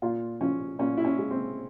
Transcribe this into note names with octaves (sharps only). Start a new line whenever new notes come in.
A#2 F4
F3 C#4
A#2 C#4
E4
C#4
G#3
C4